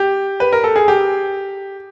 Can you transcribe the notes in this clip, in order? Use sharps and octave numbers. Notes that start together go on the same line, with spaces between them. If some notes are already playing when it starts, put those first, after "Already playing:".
Already playing: G4
B4
A#4
A4
G#4
G4